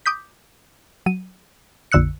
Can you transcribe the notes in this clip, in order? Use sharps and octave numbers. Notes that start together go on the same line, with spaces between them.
D6 D#6 G6 B6
F#3 D#7
A#1 F2 D3 E6 F#6 C#7